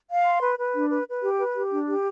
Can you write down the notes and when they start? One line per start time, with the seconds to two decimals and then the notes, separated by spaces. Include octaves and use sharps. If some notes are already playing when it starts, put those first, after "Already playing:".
0.10 F5
0.25 C6
0.41 B4
0.58 B4
0.74 D4
0.91 B4
1.07 B4
1.23 G4
1.39 B4
1.55 G4
1.71 D4
1.88 G4